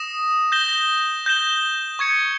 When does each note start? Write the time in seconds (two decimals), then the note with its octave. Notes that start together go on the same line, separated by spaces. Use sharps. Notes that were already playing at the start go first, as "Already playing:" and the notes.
Already playing: D#6 A#6 E7
0.52 G6 A#6 E7 G7
1.26 G6 A#6 E7 G7
1.99 C#6 G#6 C#7